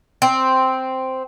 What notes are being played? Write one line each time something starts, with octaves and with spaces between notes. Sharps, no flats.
C4